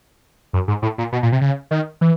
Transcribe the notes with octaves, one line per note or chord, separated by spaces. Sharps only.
F#2
G#2
A2
A#2
B2
A#2
C3
C#3
D#3
E3